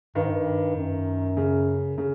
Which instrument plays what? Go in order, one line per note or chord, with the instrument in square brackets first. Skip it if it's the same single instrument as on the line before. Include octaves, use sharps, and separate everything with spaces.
[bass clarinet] G2 [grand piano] D#3
[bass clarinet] G#2
G2
F#2
[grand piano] C#3
C#3